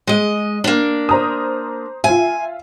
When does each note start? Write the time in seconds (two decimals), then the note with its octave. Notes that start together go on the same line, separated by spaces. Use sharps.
0.07 G#3 D#5
0.64 A#3 D4
1.09 C5 A#5 D#6
2.04 F4 E5 G#5